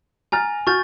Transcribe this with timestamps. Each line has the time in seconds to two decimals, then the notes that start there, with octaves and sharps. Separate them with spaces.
0.32 G#5 A#5 F6 A6
0.67 F#4 C#6 F6 G6 A6